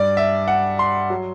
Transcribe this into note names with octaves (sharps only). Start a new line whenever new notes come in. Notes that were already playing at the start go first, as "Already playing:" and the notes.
Already playing: G2 D5
E5
F#5
C6
F#3